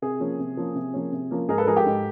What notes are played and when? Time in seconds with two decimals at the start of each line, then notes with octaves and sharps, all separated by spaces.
0.02 C3 G#4
0.20 F3 A#3 C#4
0.39 C3
0.57 F3 A#3 C#4
0.75 C3
0.94 F3 A#3 C#4
1.12 C3
1.31 F3 A#3 C#4
1.48 G#2 G#4 A#4
1.58 A4 B4
1.67 F3 G#3 G#4 A#4
1.76 G4 A4
1.86 G#2